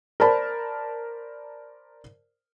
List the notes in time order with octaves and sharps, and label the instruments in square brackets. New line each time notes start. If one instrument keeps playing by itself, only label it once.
[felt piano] A#4 C5 D5 A5 B5